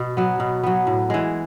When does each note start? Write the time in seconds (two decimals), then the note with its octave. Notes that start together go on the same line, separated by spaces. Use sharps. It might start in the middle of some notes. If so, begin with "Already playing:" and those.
Already playing: B2
0.17 F#3 B3
0.40 B2
0.63 F#3 B3
0.87 A2
1.10 E3 G#3